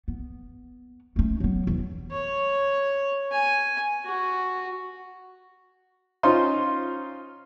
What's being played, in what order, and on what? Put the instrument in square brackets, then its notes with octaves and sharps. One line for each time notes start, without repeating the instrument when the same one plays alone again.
[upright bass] B3
A3 C#4
F#3 B3
E2
[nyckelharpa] C#5
G#5
F#4
[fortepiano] C#4 D#4 F4 C5 C6